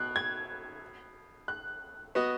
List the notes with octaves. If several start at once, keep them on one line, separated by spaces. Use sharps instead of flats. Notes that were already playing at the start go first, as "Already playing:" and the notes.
Already playing: B2 F#6
G#6
F#6
B3 F#4 D#5